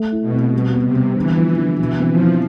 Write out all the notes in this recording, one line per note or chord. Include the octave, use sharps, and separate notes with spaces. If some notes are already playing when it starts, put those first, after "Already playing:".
Already playing: A3
E4
B2
C4
B2 G3
B3
C3
G3
D3 E3
F3
D3
B2 E3
C4
F3
E4